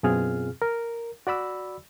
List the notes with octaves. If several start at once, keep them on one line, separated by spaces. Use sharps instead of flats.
F#2 B2 C4 F4 G#4 F6
A#4
F#4 D5 B5 E6